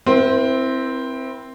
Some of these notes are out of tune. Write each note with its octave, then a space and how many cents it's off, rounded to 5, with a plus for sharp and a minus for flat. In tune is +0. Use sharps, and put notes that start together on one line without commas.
C4 +0 E4 +0 A#4 +45